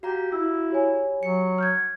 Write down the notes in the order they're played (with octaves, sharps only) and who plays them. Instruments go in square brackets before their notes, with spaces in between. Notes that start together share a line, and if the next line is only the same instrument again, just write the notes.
[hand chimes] F#4 F5 A#5 [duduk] G4
[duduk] E4 [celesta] E6
[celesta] G4 C#5 G#5
[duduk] F#3 [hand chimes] C#7
[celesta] F6 G6 G#6